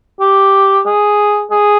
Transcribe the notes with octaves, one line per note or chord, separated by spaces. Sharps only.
G4
G#4
G#4